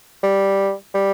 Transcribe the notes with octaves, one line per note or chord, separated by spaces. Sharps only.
G3
G3